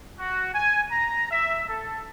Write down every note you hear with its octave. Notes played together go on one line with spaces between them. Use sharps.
F#4
G#5
A#5
E5
A4